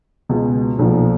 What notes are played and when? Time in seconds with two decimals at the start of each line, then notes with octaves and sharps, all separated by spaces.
0.29 C#2 B2 G#3
0.79 B1 A#2 F3